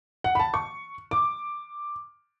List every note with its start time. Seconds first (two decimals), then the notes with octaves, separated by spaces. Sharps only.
0.24 F#5
0.35 B5
0.39 A5
0.54 C#6
1.11 D6